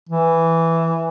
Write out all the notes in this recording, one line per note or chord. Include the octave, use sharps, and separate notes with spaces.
E3